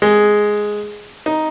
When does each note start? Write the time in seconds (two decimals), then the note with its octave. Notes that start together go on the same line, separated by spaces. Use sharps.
0.02 G#3
1.26 D#4